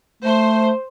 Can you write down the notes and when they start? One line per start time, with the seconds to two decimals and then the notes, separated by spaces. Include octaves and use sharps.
0.23 A3 C5